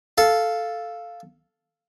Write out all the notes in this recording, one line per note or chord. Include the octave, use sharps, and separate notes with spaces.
A4 F5